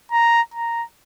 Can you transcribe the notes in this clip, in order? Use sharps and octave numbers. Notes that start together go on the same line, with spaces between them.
A#5
A#5